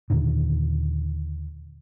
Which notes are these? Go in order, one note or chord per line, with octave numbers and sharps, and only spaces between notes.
D#2 A#2 D3 D#3